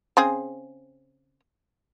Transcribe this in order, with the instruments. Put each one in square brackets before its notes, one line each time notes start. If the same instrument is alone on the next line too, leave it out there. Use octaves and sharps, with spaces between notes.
[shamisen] C#3 C4 G#4